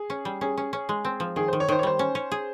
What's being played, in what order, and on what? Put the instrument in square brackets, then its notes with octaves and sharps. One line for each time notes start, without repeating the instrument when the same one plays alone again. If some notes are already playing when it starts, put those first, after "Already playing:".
Already playing: [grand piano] G#4
[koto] C#4
G3
[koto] C#4 [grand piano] G#4
[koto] C#4
C#4
G#3
C4
F3
[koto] D#3 [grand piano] G#4
[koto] D#3 [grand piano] C5
[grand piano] C#5
[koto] D#3 [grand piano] C5
[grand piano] C#5
[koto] G3 [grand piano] C5
[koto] C#4
C#4
G#4